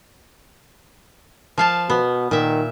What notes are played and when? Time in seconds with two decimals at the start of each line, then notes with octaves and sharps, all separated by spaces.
1.58 F3 F5 A5
1.90 B2 B3
2.31 A#2 D#3 E5